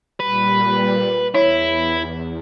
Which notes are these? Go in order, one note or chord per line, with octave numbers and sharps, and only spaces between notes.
A#2 G3 B4
E2 E4 C#5